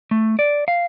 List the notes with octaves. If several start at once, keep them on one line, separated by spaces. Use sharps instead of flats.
A3
D5
F5